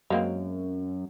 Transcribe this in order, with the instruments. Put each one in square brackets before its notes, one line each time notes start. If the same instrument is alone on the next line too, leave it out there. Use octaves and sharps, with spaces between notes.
[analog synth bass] F#2 [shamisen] G#3 A#3 C4